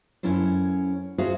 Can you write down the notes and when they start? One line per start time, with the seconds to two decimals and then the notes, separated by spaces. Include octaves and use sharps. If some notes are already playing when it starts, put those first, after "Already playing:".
0.23 F#2 C#4 E4 A4 C5
1.18 F#4 G#4 C5 E5 F5